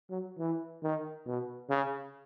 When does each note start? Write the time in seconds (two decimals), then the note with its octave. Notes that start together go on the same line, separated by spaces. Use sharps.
0.10 F#3
0.39 E3
0.83 D#3
1.26 B2
1.70 C#3